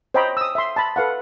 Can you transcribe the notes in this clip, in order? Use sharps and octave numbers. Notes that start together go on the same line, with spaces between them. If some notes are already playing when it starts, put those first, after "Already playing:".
C5 C#5 D#5 G5 A#5 B5
D#6 E6
E5 C6
A5 B5
A4 B4 F5 F#5